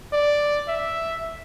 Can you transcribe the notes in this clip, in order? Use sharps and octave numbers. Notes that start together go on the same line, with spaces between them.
D5
E5